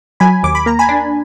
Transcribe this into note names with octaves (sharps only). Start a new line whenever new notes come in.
F#3 G#5 B5
D#2 D6
B5
A#3 A#5
G#5 B5
D4